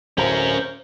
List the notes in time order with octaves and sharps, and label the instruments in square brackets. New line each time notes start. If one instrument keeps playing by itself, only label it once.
[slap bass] D1 [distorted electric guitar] C#4 A#4 [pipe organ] C5